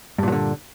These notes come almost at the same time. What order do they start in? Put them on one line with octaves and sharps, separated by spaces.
G2 A#2 F#3 D3